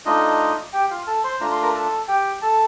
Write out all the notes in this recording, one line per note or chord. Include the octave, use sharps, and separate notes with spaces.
A3 D4 D#4 F4 D#5
G4 G5
F4 F5
A4 A5
C5 C6
A3 D4 F4 A#5
C6
A#4 A#5
A4 A5
G4 G5
A4 A5